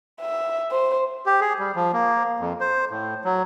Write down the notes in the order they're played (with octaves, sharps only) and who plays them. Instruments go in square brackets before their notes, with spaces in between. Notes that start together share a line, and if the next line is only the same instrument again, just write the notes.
[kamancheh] E5
C5
[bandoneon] G4
G#4
G3
F3
A#3
F2
C5
A2
F#3